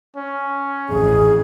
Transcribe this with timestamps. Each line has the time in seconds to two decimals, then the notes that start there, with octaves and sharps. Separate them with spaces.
0.16 C#4
0.89 A1 F2 G#4